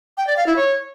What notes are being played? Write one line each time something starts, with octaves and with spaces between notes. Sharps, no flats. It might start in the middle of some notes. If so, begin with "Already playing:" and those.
G5
D5
F5
E4
C#5